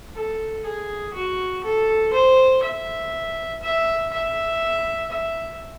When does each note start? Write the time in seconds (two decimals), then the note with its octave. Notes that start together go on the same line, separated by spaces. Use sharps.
0.15 A4
0.65 G#4
1.14 F#4
1.64 A4
2.14 C5
2.63 E5
3.63 E5
4.13 E5
5.12 E5